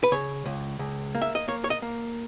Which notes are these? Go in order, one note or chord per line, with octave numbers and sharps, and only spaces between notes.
B4
C#3 C#5
C#2
C#2
A#3
E5
D#5
A#3 C#5
C#5
D#5
A#3